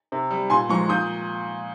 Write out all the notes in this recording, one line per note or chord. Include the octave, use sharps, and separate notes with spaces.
C3
G3
A#2 G#5 C6
F3 G#3 A#5 C#6
A#2 D#6 G6